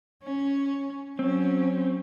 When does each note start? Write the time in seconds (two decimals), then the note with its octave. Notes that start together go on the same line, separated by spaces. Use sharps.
0.23 C#4
1.19 F#3 C4 C#4